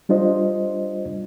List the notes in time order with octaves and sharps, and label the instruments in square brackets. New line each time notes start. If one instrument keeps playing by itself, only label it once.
[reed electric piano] G3 D4 F4 C5 D#5